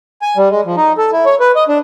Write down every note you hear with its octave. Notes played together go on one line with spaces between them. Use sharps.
G#5
G3
G#3
F3
D#4
A4
E4
C#5
B4
D#5
D4